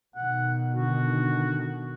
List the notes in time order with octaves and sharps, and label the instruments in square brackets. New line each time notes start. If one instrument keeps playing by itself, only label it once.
[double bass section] B2 D#3 [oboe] F#5
[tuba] D3 [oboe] F#4